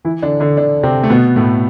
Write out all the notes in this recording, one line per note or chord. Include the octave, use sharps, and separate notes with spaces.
E3 E4
D3 D4
D3 D4
D3 D4
C3 C4
A3
B2 B3
A2 A3